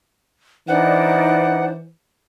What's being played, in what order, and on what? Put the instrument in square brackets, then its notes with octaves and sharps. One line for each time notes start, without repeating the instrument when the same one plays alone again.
[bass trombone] E3 [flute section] D4 D#4 D5 [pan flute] C5 [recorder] F#5